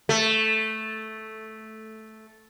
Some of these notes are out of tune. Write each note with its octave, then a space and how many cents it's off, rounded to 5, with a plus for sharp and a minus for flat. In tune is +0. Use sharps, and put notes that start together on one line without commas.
A3 -5